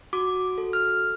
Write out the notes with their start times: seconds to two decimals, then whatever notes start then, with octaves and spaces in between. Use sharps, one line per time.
0.13 F#4 D6
0.58 A4
0.73 F6